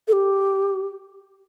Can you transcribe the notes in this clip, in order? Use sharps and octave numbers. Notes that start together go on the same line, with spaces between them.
A4
G4